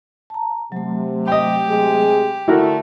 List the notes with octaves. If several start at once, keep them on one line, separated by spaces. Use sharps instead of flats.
A5 A#5
C3 F#3 A3
G4 D#5 G5
C3 G#3 G#4
D3 A3 E4 F#4 A#4